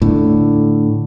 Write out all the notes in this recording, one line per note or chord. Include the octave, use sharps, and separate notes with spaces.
A2 D3